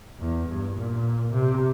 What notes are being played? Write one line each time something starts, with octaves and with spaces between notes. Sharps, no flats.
E2
G2
A#2
C3